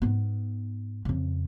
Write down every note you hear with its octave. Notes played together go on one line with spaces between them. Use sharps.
G#2 B3
F2 C#3